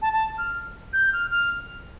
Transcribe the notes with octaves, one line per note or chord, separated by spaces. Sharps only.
A5
A5
F6
G6
F6
F6